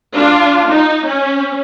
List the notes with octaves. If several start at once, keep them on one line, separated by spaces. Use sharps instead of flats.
D4 F4
D#4
C#4